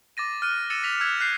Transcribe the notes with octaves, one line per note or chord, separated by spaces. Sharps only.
D6 A6 A#6 D#7
F6 F#6 D#7
E6 A6 C#7 D#7 E7
B6 F7
E6 F#6 G#6 B6 F7
F#6 G6 A6 C7